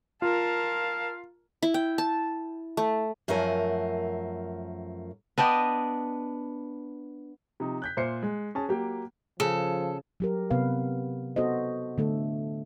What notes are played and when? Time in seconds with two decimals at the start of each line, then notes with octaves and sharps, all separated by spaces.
0.22 F4 A#4 F5 A5
1.63 E4
1.74 G5
1.98 A5
2.77 A3
3.28 F#2 F3 A3 A#4 F#5 G#5
5.38 B3 D4 D#5 G5
7.60 C3 F3 D#4
7.82 F#6 G6 B6
7.97 A#2 C5 E5 C7 C#7
8.23 G#3
8.55 C#4 G#4 A5
8.68 F#3 A#3 G4
9.40 C#3 F3 A4
10.20 F#3 G4 A#4
10.50 C3 B3 B4 F5
11.36 B3 F#4 A4 C5 D#5
11.98 D3 A3 A4